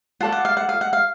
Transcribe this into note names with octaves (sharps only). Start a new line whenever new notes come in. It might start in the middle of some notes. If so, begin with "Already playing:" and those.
F4 A4 D5 F#5
F#5
F5
F#5
F5
F#5
F5